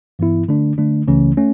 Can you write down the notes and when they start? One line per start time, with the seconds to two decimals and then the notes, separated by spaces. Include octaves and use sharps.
0.19 G2 E3 B3 E4
0.49 D3 A3 D4
0.78 D3 A3 D4
1.08 C#2 C#3 E3 A3 C#4
1.37 A3 C#4